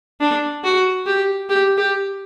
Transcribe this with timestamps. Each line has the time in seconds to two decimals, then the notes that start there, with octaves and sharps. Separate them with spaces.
0.20 D4
0.64 F#4
1.06 G4
1.49 G4
1.77 G4